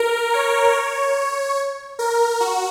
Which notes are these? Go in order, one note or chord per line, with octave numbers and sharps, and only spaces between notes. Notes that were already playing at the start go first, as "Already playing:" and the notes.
Already playing: A#4
C#5
A#4
F#4